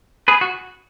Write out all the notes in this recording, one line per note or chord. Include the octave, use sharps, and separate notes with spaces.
G#4 B4
F#4